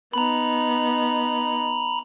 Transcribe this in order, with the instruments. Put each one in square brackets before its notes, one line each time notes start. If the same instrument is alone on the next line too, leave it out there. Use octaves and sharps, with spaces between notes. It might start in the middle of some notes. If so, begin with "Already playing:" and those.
[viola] B3 D#4 [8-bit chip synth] A#5 B5